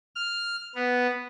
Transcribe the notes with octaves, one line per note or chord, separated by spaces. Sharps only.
F6
B3